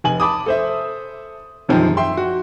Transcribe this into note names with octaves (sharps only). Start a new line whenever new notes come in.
F1 G#5 F#7
A5 B5 D6 D#6
A4 C5 E5
E1 F#2 D#3 F3 G4
E5 G5 C6
F#4